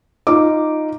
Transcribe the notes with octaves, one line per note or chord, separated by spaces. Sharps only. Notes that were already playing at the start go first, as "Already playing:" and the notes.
D#4 F4 D6